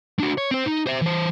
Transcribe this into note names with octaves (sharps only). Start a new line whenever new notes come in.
D4 F#4
C#5
C4 C5
D#4
C5 E5
E3 C5